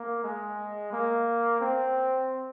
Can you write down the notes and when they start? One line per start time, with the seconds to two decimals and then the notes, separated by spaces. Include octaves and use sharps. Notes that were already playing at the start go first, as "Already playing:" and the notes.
Already playing: A#3
0.24 G#3
0.92 A#3
1.61 C4